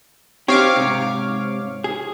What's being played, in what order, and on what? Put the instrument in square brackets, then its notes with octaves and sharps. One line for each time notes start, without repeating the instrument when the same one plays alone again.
[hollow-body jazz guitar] C4 D#4 G4 [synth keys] C#5 F5 D6
[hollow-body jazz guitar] G#2 C3
G#4